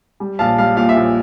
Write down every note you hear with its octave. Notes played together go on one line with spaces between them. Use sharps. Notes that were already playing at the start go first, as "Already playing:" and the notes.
G3
A#1 F5 A5
G3 F5
A#2 F5
E5
A#1